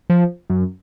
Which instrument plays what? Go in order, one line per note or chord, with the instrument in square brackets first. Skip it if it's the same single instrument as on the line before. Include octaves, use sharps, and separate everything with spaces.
[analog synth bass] F3
F#2